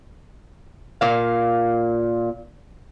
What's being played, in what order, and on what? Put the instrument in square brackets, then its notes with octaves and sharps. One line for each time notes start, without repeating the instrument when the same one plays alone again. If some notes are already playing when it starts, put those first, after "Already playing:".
[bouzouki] A#2 F5